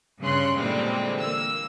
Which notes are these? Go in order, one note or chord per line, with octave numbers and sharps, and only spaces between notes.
G2 C#3 C#4 C6 F#6
A#2 D3 E3 G3 G#3 C4
A#3 E6